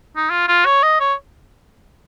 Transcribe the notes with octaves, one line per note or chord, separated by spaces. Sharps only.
D#4
F4
F4
C#5
D#5
C#5